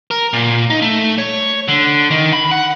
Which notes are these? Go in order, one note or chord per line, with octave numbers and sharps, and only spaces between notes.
A#4
A#2
D#4
A3
C#5
D3
D#3
B5
F#5